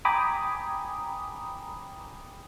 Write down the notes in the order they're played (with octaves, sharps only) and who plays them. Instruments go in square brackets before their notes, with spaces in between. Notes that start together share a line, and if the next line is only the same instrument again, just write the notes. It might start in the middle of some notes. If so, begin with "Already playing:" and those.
[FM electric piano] G5 G#5 A#5 B5 D6 D#6